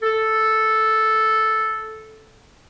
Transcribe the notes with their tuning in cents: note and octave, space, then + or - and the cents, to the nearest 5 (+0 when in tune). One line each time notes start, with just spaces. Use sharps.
A4 -5